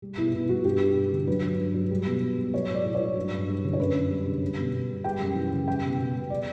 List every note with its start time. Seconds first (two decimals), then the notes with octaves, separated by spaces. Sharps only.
0.02 G3
0.17 B2 E4
0.33 B2 E4
0.49 G3 F#4
0.64 G2 G4
0.80 G2
0.96 G3
1.12 D3
1.27 F#3 B4
1.43 G2
1.59 G2
1.74 F#3
1.91 G3
2.06 B2
2.22 B2
2.38 G3
2.53 F#3 C#5
2.69 A2
2.75 D5
2.84 A2
2.95 C#5
3.00 F#3
3.16 G2
3.32 G2
3.48 G3
3.64 D3
3.73 C#5
3.79 F#2 B4
3.94 F#2
4.11 G3
4.26 D3
4.42 G3
4.58 B2
4.73 B2
4.89 G3
5.04 G3 G5
5.21 F#2
5.35 E3
5.52 C#3
5.68 G3 G5
5.84 B2
5.99 B2
6.15 G3
6.30 D5